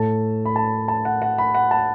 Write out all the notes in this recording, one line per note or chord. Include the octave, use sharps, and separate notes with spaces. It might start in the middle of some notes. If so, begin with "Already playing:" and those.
Already playing: A2 A3 A5
B5
A5
A5
F#5
F#5
B5
F#5
A5